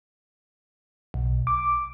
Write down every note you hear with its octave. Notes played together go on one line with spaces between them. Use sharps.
B1
D6